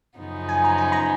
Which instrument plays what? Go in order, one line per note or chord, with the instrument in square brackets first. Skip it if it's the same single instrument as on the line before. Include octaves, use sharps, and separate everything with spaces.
[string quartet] F#2 C#3 F3 B3 D#4
[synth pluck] G#5
A#5
G#5
A#5